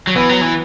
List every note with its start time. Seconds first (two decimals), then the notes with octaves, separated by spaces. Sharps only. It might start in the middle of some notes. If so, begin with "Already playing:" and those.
0.07 F#3
0.16 E3 B3
0.29 F#3
0.41 E3